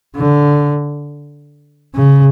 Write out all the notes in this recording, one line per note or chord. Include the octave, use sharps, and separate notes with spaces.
D3
C#3